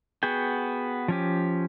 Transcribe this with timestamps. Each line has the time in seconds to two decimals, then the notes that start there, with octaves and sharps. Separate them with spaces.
0.23 B3 F#4 G#4 G5
1.08 F3 C#4 G4